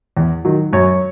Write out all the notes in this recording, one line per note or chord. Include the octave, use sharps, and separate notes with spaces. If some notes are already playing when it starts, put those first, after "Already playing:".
E2
D#3 F#3
F#2 C#5